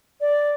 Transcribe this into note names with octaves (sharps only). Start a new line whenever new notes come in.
D5